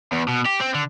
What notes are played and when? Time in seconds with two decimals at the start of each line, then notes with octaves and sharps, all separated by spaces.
0.12 E2
0.28 B2
0.46 G4
0.60 C4
0.74 D3